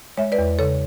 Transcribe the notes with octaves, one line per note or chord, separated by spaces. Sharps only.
G#3 C#5 E5
B4 D5
E2
C#3 A4 C#5